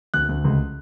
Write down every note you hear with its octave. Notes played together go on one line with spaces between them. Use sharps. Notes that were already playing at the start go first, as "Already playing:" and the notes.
D2 F#6
D2
C#2